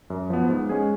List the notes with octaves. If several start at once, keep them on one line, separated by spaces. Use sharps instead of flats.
F#2
F3 B3
G#2
G#3 C#4 G#4